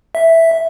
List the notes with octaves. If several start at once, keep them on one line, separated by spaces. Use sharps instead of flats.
E5